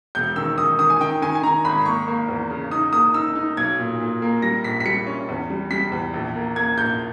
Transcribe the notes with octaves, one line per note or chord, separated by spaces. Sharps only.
E1 G6
D#3 E6
D#3 D#6
D#3 D#6
G#5
D#3 G5
D#3 G#5
G#5
D#3 A#5
G#1 B5
A#3 C#6
A#3
E2
C#3
D#4 D#6
A#3 D#6
D#4 E6
D#4
B1 G#6
A#2
A#2
A#3
G3 A#6
A#1 B6
B6
G3 C#7
C#4
E2
G3
G3 B6
E2
A#1
A#3
A#3 G#6
A#1 G6